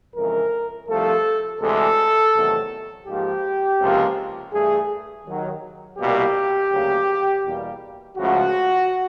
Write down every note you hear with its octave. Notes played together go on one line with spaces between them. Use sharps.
F2 C#3 E3 G#3 A#4
C2 C3 F3 A3 A4
D2 C3 E3 G#3 A4
E2 C3 D#3 F#3 A3
G#2 F3 A#3 G4
C#2 C3 F3 A#3
G2 E3 A3 G#4
D#2 D#3 F#3
C2 B2 G3 A#3 G4
D2 C#3 F#3 A#3
E2 B2 G3 A#3
C#2 C#3 F3 A3 F#4